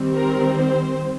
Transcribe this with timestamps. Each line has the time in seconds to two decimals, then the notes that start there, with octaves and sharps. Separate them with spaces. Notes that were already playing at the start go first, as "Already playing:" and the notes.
Already playing: D#3 G3 C4
0.15 A#4
0.57 C5